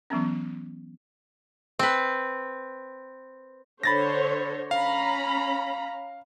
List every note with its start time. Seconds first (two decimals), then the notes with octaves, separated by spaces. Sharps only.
0.10 E3 F#3 B3 C#4
1.79 C4 B4
3.83 D3 C5 C#5 B5 A6 A#6
4.71 C#4 F5 A#5 B5